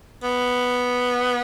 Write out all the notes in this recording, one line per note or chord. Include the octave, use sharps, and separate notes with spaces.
B3